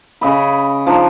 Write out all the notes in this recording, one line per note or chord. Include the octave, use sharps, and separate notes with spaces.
C#3 D#5 B5
F3 D4 D#4